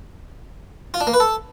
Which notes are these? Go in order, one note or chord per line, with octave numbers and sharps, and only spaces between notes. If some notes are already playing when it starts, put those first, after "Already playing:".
F4
D4
A#3
B4
A4